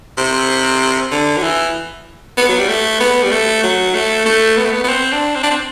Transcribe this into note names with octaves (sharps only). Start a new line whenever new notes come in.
C3
D3
F#3
E3
B3
F#3
G3
A3
B3
G3
A3
F#3
A3
A3
B3
A3
B3
B3
C4
D4
C4
D4
C4